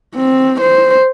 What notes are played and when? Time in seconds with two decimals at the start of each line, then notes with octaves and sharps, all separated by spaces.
0.15 C4
0.60 C5